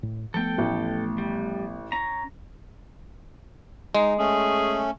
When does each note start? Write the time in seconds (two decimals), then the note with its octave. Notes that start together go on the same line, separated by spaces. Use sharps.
0.03 A2
0.34 F3 A3 B3 A4 G5
0.58 A1
1.18 G3
1.92 C#4 A#5
3.95 G#3 D#4
4.19 A3 C#4 G#4